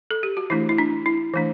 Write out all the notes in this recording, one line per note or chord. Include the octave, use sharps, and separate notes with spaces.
A4
G4
F#4
E3 A3 D4 E4
E4
D4
E4
E3 A3 D4